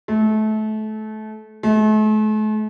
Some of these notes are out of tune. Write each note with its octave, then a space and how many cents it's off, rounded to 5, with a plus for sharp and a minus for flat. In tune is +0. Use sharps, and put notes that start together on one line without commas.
A3 -25
A3 -40